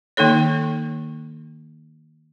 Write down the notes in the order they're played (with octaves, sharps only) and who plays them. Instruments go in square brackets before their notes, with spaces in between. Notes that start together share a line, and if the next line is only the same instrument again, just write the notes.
[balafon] D#3 A#3 D#4 A4 C#5